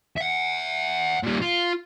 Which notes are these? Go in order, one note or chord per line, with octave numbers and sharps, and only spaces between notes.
E5 F#5
A#2 G3
F4